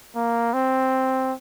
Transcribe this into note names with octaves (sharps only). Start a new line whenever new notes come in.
A#3
C4